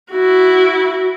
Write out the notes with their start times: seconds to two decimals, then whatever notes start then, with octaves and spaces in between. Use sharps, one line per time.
0.11 E4 F#4